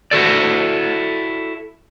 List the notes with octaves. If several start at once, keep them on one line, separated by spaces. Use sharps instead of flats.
E4 F#4 A4 D5